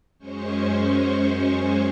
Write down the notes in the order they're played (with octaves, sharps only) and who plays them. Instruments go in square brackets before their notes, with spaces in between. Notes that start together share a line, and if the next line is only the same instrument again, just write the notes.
[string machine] F#2 G#3 C#4 C5 C#6